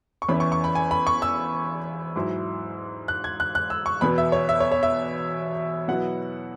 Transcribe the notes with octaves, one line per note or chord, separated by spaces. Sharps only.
C#6
E2 E3 C#4 E4 B5
C#6
C#6
B5
G#5
B5
C#6
E6
G#2 F#3 E4
F#6
G#6
F#6
F#6
E6
C#6
E2 B2 B3 B5
E5
C#5
E5
C#5
C#5
E5
B2 F#3 B3 E4 F#5